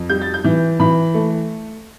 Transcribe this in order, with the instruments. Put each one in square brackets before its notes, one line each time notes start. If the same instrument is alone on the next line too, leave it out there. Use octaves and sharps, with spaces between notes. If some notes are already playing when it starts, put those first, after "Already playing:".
Already playing: [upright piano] F2
G3 G6
A6
G6
E3
E3 B5
A3